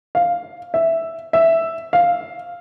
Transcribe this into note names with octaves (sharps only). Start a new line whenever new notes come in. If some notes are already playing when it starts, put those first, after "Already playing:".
F5
E5
E5
F5